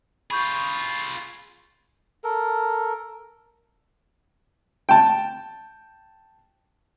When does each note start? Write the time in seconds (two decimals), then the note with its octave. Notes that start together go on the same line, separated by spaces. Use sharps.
0.31 F4 G#4 B5 C#6 G6
2.24 A4 A#4
4.89 G5 A5